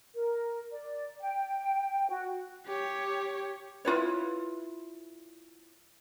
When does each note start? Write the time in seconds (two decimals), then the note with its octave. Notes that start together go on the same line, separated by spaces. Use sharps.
0.14 A#4
0.70 D5
1.21 G5
2.09 F#4
2.66 G4 C#5
3.85 E4 F4 B4 C#5